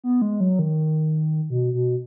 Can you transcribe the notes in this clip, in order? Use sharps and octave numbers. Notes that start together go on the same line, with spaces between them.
B3
G#3
F#3
D#3
B2
B2